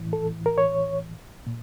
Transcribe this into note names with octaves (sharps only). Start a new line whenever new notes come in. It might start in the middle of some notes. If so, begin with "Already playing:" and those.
Already playing: A2 E3
A4
A#4
C#5
A#2